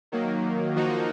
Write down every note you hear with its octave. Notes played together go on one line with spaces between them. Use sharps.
D#3 F#3 A#3
F3 A#3 D#4 F#4